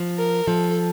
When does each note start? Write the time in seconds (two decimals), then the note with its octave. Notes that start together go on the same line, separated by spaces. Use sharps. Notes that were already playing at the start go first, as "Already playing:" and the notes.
Already playing: F3
0.18 A#4
0.47 F3 A4